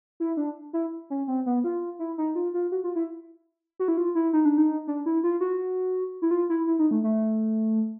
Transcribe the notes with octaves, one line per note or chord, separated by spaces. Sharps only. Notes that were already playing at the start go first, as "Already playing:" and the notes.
E4
D4
E4
C#4
C4
B3
F4
E4
D#4
F4
F4
F#4
F4
E4
F#4
E4
F4
E4
D#4
D4
D#4
D4
E4
F4
F#4
E4
F4
E4
E4
D#4
A3
A3